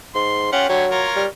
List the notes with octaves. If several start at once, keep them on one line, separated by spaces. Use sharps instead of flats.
G#2 C6
C#4 F4 G4 F#5
D3 F#3 G4 C#5
F4 A#4 C#5
G3